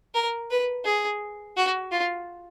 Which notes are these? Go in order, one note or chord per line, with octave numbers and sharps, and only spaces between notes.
A#4
B4
G#4
F#4
F4